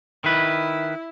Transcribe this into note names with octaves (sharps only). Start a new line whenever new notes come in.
D#3 E4 B4